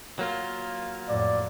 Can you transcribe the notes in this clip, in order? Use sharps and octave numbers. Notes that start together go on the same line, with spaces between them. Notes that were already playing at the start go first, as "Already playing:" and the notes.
F#3 A#3 F4
F2 A2 D5